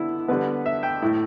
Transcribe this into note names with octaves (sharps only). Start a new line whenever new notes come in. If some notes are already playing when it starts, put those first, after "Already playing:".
Already playing: D3 B3 E4
D3 G3 B3 B4
E5
G5
A2 A3 E4